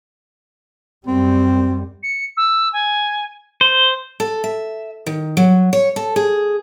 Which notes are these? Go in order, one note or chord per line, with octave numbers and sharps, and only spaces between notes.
F#2 G3 C4
C#7
E6
G#5
C5
A4
E5
D#3
F#3
C#5
A4
G#4